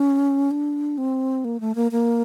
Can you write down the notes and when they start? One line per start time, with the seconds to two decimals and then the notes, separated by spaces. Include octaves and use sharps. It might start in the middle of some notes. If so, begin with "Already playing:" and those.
Already playing: C#4
0.51 D4
0.98 C4
1.45 A#3
1.60 A3
1.75 A#3
1.92 A#3